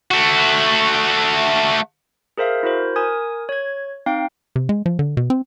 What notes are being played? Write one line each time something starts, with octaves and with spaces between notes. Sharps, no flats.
A3 F#4
G#4 A#4 C5 E5 F5
E4 F#4 A#4 C5
A#4 G#5 D#6 G#6
C#5 G#6
C4 D#4 F5 G5
C3
G#3
F3
D3
B2
C4